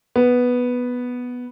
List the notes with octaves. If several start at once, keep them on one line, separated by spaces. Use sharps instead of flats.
B3